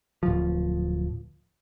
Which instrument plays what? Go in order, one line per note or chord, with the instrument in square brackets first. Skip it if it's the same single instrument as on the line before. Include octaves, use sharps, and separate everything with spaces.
[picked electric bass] D1 F3